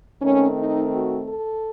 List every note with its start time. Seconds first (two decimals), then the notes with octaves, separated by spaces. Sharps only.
0.22 D#3 A3 C4 C#4
0.56 D#4
0.92 F#4
1.27 A4